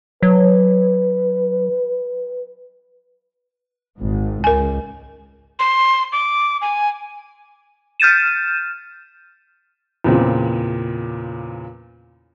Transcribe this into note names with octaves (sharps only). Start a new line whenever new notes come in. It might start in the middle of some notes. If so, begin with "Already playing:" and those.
F#3 B4
G#1 G#2
C#2 A#4 G#5
C6
D6
G#5
F6 G6 A6 D#7 E7
E2 A#2 C#3 C4